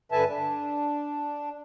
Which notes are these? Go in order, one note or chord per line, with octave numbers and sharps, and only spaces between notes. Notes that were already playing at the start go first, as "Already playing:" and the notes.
G2 D3 B4 E5 G#5 A5
D4